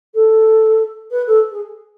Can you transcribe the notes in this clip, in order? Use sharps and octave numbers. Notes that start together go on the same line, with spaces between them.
A4
B4
A4
G#4